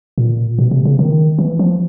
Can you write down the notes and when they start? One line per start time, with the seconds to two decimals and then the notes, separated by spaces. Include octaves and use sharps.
0.18 A#2
0.59 B2
0.71 C3
0.85 C#3
0.99 D#3
1.39 E3
1.59 F3